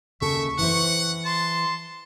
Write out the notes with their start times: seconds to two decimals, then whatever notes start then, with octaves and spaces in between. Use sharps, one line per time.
0.21 D#2 C#3 A4 E5 C#6
0.59 E3 E4 C5 F#5
1.25 A5 C6